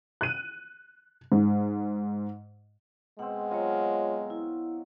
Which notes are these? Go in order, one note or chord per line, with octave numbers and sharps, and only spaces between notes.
F#6 D#7
G#2
B2 G#3 C4 F#5
F#3 F4 C#5 D#5 F5
E4